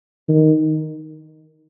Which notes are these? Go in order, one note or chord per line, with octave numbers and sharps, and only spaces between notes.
D#3